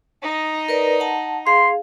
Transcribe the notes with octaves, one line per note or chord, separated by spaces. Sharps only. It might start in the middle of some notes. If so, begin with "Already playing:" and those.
D#4 D#5
A#4 B4 D5
F#5 A5
G#4 F5 C6